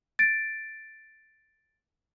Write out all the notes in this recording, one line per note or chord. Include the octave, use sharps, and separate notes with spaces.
A6 D7